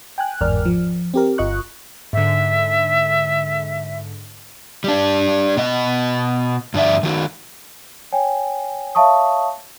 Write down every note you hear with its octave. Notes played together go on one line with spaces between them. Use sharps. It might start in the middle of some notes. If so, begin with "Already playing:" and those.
G5 G#5 F#6
G1 E2 G#2 A#4 D5 F6
F3
C4 G4 A#4
G1 F4 D#5 C#6 F#6
G#2 D3 E5
G3 D4
B2 D#5
G2 D3 D5 E5
D#3 F#4
C#5 G5 G#5
C#5 E5 F5 A5 C#6 D#6